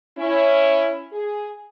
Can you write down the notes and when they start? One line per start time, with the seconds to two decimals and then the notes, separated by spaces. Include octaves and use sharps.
0.17 C#4 E4
1.12 G#4